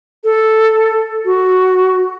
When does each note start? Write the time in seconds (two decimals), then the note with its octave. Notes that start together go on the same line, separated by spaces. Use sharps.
0.24 A4
1.25 F#4